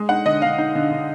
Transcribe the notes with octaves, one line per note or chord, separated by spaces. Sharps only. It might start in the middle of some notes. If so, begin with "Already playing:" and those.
Already playing: G#3
D#4 F#5
D3 D#5
D3 F5
D#4
D3
D3